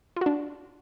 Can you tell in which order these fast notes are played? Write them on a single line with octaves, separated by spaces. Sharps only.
F4 F#4 D4